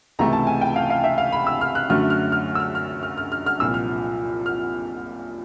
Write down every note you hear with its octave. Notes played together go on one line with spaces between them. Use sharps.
C#2 C3 E3 A3 A#5
A5
G#5
G5
F5
F5
E5
F5
B5
E6
F6
F#6
F#2 D3 F#3 A3 F6
F6
F6
E6
F6
F6
F6
F6
F6
F6
C2 A#2 F3 E6
F6
F6